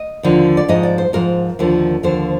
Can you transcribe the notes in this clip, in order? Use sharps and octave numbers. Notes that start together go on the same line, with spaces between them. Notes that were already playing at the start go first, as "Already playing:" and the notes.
Already playing: D#5
D#2 D3 F3
D5
G#2 F3 D#5
D5
C5
G#2 F3 A#4
D#2 D3 F3
D#2 D3 F3 C5